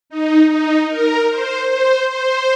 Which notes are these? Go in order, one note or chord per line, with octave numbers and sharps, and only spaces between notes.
D#4
D#4
A#4
C5
C5
C5